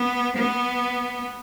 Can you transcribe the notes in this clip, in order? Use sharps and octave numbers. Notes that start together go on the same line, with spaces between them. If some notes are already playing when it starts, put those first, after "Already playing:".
Already playing: B3
B3